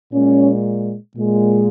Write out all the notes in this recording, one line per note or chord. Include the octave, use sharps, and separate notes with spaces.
A#2 G#3 C#4
A#2 G#3